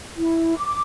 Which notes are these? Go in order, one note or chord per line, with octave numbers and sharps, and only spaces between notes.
E4
D6